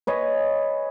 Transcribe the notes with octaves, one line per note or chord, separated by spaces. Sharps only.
B4 C#5 D#5 G#5